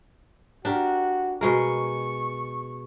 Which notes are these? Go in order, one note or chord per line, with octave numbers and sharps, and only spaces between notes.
D4 F#4 G4 A#4
B2 G#3 A#4 C#6